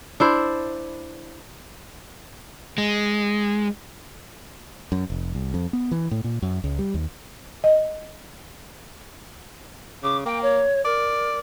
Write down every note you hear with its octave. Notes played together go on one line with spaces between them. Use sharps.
D4 E4 C5
G#3
F#2
F1
C2
F2
B3
E3
A2
A#2
F#2
C#2
G3
D#2
D#5
C#3 D6
A#3 G5
C#5
A#4 D5